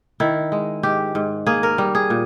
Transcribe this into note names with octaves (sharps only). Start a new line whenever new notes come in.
D#3 E4
G#3
G#2 G4
G#2
A#3 G#4
A#4
G3
G#4
A#2